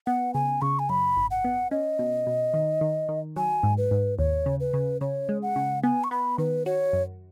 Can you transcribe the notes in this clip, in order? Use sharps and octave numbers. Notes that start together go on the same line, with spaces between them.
B3 F#5
C#3 G#5
C#3 C#6
G#5
F#2 B5
G#1
F#5
B3
C#4 D#5
B2
B2
D#3
D#3
D#3
F#3 G#5
G#2
B4
G#2
D#2 C#5
C#3
B4
C#3
C#3 C#5
G#3
F#5
C#3
B3 G#5
C#6
B3 B5
D#3 B4
F#4 C#5
F#2